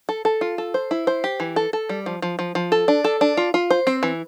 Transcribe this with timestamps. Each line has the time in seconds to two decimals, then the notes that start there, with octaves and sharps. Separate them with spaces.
0.09 A4
0.25 A4
0.41 F4
0.58 A4
0.74 C5
0.91 E4
1.07 C5
1.24 G4
1.40 E3
1.56 A4
1.73 A4
1.89 G3
2.06 F3
2.22 F3
2.39 F3
2.55 F3
2.72 A4
2.88 D4
3.04 A4
3.21 D4
3.37 F4
3.54 F4
3.70 C5
3.87 C4
4.03 E3